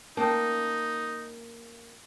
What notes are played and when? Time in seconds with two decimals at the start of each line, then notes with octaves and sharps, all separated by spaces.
0.17 A#3 C#4 D#4 A5